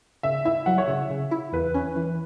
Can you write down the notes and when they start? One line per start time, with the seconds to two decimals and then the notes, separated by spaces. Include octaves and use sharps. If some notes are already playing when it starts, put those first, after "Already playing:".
0.23 C#3 E5
0.45 E4 E5
0.66 F#3 F#5
0.78 C#5
0.88 C#3 E5
1.10 C#3
1.31 E4
1.53 E2 B4
1.74 C#4
1.96 E3